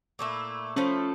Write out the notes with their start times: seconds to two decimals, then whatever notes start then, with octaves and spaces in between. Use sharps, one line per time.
0.19 A#2 A3 E4
0.76 F3 A3 C#4 E4 A4